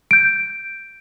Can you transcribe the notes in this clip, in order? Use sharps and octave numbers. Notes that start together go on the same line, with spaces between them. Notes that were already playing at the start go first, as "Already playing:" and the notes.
G6 D7